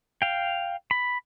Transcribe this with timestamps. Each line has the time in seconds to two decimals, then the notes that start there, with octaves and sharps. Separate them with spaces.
0.22 F5 G5
0.91 B5